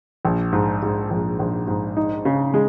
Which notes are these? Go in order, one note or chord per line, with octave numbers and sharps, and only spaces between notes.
A#1
G#2
G#2
A#1
A#1
G#2
D#4
C#3
G#3